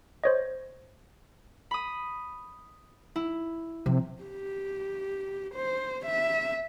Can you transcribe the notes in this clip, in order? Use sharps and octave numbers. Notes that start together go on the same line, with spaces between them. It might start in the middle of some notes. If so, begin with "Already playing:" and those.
C5 C#5 D#5
B5 D#6
E4
C3 F3
G4
C5
E5